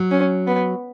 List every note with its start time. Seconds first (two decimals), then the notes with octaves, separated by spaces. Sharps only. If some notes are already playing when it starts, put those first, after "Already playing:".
Already playing: F#3
0.11 C#4
0.47 B3